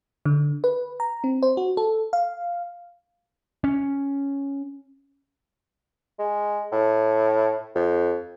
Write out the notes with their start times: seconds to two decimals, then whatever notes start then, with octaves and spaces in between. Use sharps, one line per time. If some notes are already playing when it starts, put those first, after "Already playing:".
0.26 D3
0.64 B4
1.00 A#5
1.24 C4
1.43 C5
1.57 F#4
1.77 A4
2.13 F5
3.64 C#4
6.19 G#3
6.72 A2
7.75 F2